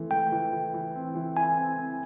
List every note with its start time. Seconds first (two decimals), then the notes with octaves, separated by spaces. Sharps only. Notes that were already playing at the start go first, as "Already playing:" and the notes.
Already playing: E3 A3 C4
0.11 A3 G5
0.32 E3
0.53 E3
0.74 E3
0.95 C4
1.15 E3
1.37 E4 G#5
1.57 C4
1.78 C4